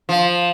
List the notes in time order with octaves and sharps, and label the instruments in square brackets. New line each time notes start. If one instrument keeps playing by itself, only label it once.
[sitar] F3